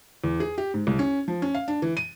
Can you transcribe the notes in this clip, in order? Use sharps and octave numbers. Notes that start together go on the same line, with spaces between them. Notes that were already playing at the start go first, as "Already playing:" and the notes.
E2
G#4
G4
G#2
C2
C#4
F3
C#4
F5
D4
E3
D#7